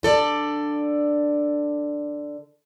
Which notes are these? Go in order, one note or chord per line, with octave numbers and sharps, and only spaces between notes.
D3 A4 D5